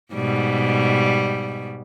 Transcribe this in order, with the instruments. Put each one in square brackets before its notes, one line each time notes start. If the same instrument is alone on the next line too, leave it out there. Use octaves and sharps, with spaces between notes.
[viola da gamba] G#2 B2 G3